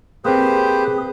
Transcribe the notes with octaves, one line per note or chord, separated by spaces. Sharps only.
A#3 C4 G4 G#4 B4 C5